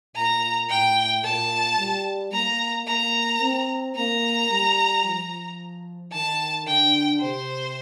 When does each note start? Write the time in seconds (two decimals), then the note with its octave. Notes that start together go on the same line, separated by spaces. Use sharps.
0.16 A#2 A#5
0.69 A2 G5
1.24 A#2 A5
1.78 G3
2.32 A#3 A#5
2.87 A#3 A#5
3.40 C4
3.95 A#3 A#5
4.50 G3
5.04 F3
6.12 D#3 A5
6.66 D3 G5
7.21 C3 C5